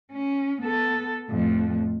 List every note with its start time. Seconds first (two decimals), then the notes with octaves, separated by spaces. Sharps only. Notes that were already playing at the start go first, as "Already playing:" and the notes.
0.11 C#4
0.61 B3 A4
1.30 F2 A2